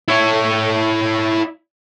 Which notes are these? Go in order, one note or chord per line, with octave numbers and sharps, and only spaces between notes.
E4 C#5